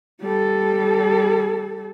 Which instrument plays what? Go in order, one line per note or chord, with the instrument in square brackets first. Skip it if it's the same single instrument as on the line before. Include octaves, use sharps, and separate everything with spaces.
[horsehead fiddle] G3 A4